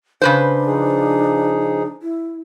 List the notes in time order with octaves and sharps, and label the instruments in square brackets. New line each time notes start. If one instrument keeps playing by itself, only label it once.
[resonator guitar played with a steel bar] C#3 B4 C5 [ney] D4
[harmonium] F3 D#4 G#4
[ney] E4